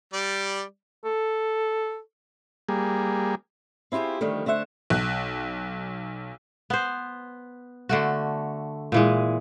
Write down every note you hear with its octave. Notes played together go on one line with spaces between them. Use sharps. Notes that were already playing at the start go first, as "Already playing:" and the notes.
G3 D5
A4
G3 A#3 G#4
C4 E4 F4 G4 G#4
D3 D#3 F3 G3 A3
D3 A3 C5 E5 F#5
B1 F#6
B3 C5
D3 A3 F#4
A#2 E3 G#3